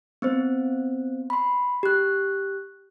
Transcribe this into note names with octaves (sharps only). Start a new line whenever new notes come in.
B3 C4 C5
B5 C6
G4 F#6